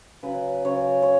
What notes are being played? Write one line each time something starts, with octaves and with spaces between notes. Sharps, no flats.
C#3 F#3 B4
C#3 F#3 C#5
C#5